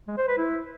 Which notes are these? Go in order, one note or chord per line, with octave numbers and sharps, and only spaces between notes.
G#3
C5
B4
E4